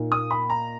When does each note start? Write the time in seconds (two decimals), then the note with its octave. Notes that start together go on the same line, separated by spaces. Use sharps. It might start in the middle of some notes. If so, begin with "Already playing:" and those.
Already playing: A#2 A#3 D#4
0.12 D#6
0.31 B5
0.50 A#5